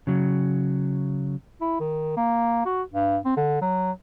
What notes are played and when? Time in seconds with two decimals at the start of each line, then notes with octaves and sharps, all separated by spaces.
0.07 C#3 F#3
1.61 E4
1.80 D#3
2.17 A#3
2.66 F#4
2.93 G2
3.25 C4
3.37 D3
3.62 F#3